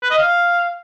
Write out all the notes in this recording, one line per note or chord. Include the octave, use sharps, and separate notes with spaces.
B4
D#5
F5